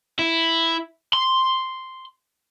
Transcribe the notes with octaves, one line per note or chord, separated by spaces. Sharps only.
E4
C6